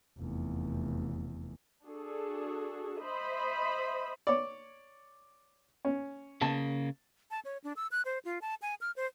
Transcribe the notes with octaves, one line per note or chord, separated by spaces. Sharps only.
F1 E2
D4 F#4 G#4 A4
C5 D#5 E5 B5
C#5 D5
C#4
C#3 A#3 A5
A5
C#5
D4
E6
F#6
C5
F4
A5
G#5
F6
C5